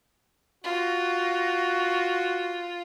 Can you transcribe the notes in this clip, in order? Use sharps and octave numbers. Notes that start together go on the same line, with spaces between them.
F4 F#4